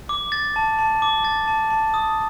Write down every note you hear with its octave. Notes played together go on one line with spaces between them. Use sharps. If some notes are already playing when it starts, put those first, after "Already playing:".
D6
A6
A5
A5
D6
A6
A5
A5
D#6